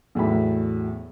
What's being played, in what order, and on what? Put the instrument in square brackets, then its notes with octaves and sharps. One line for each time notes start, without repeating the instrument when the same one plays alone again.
[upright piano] E2 A2 F#3 B5